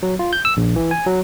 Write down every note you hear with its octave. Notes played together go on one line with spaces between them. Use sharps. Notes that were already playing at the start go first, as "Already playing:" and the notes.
F#3
F4
G6
E6
A#1
E3
G#5
F#3